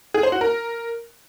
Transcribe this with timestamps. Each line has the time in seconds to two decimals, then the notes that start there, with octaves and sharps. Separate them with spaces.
0.14 G#4
0.23 C5
0.32 F#4
0.41 A#4